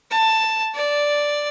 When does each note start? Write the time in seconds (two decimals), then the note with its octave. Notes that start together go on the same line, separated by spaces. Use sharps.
0.10 A5
0.75 D5